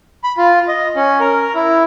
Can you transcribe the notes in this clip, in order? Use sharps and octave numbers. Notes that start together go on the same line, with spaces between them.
B5
F4
D#5
C#4
A#4
E4